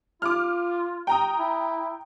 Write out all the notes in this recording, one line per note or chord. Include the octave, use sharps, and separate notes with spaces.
F4 D6 F6
G5 A#5 D#6
E4